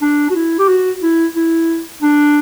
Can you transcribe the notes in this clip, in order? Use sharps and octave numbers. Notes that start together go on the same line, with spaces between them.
D4
F#4
E4
G4
F#4
E4
E4
D4